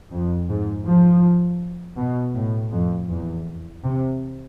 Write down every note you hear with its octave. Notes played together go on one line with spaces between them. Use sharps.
F2
G#2
F3
B2
A2
F2
E2
C3